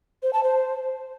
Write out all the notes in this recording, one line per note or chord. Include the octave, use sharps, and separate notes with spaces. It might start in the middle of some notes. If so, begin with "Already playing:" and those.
C5
A5
C5